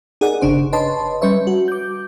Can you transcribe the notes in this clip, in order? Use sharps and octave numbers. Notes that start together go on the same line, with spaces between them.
D#4 G#4 A#4 D5 F#5
G1 C#3 D4 C5
B4 C#5 D#5 A5 C6
G3 C#4 B4 C#5 E5
F#4
D6 G6